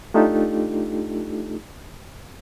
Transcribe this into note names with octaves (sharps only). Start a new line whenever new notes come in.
A3 D4 D#4 F4 G4 A4